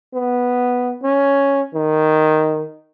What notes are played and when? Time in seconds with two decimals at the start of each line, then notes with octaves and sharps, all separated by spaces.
0.14 B3
1.03 C#4
1.74 D#3